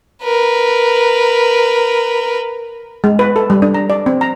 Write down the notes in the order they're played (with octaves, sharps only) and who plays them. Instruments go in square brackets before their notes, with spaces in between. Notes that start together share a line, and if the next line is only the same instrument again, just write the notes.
[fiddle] A#4 B4
[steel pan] G#3
B4
A4
G3
D4
A#5
D5
C4
A#5